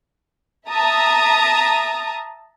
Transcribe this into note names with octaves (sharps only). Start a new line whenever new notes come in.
E5 A5 A#5 D#6